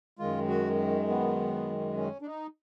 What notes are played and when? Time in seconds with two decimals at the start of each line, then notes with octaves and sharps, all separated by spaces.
0.19 F#2 D#3 G#3 F4
0.48 F#4
1.09 B3
1.97 C#4
2.22 D4
2.26 D#4